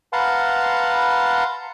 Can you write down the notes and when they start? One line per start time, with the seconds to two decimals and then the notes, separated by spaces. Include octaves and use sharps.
0.13 B4 F5 F#5 A5 A#5 C6